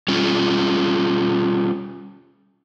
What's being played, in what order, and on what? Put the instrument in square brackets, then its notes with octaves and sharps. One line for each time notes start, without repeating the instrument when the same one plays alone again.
[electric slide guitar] G3 C#4 F4